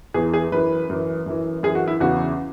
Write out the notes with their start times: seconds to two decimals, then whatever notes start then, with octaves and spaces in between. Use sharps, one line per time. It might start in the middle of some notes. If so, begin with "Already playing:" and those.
0.14 E2 E3 G#4
0.34 G#4
0.52 F#2 E3 B4
0.90 F#2 E3
1.26 F#2 E3
1.63 F#2 E3 G#4
1.75 F#4
1.88 E4
2.00 E2 C#3 E3 F#4